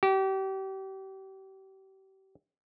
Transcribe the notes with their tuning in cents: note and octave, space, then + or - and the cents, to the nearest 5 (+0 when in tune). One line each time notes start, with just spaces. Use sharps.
G4 -35